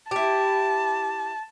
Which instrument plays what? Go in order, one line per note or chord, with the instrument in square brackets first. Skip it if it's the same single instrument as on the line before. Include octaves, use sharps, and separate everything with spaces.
[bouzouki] E4 G4 [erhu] A5